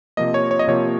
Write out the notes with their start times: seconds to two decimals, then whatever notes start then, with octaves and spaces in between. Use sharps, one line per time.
0.17 C3 F3 A#3 D#5
0.34 C#5
0.51 C#5
0.59 D#5
0.67 C3 F3 A#3 C#5